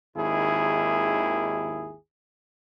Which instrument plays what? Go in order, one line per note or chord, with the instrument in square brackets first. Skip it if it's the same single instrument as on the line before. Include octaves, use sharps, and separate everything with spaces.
[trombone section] G#1 D#2 E4 G#4